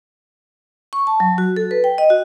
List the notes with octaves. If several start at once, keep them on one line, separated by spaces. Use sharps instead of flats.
C#6
A5
F#3
F#4
A4
B4
G5
D#5
F#4